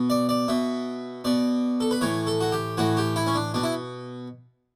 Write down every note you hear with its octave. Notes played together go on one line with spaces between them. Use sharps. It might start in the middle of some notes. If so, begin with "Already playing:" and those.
Already playing: B2
D5
D5
B2 E5
B2 D5
A4
B4
A2 E3 C#5
A4
F#4
G4
A2 E3 F#4
G4
E4
C#4
D4
B2 D4
E4